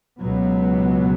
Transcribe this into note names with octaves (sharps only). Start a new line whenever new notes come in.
C#2 B2 F#3 B3